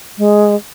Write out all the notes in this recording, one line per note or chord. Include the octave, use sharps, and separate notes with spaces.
G#3